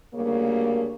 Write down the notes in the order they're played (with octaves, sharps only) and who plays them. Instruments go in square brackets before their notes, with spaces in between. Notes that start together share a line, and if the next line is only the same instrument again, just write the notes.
[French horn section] D2 C#3 G3 A#3